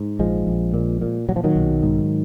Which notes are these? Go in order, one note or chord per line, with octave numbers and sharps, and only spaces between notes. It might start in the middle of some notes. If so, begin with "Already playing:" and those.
Already playing: G#2
A#1 F3 G#3
A#1
A#2
A#2
A#2 F#3
F3
D#3 F#3
B1
G#2